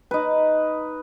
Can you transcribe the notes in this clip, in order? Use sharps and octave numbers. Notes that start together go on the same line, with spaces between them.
D#4 B4